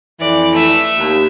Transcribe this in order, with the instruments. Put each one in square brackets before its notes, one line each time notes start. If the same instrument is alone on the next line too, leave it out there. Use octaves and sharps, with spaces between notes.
[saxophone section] F2 E3 [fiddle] D5
[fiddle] A3 E5
[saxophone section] D#2